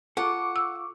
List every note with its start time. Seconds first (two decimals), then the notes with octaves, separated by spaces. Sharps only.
0.17 F4 A4 F#5 C#6 D6
0.56 E6